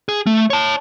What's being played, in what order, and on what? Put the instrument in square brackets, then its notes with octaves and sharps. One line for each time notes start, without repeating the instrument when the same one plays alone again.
[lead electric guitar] G#4
A3
C#5 A5